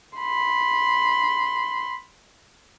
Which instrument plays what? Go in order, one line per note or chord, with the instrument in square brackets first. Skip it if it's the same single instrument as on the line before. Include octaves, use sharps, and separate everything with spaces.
[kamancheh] B5 C6